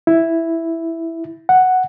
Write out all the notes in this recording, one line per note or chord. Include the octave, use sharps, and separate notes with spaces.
E4
F#5